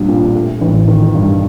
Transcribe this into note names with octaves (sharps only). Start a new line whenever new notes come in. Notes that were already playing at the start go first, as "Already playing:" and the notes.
Already playing: A#1 G3 D4
A#2
A3
A1
D#3
G2